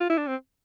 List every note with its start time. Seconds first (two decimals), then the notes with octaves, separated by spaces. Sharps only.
0.01 F4
0.10 E4
0.18 D4
0.28 C4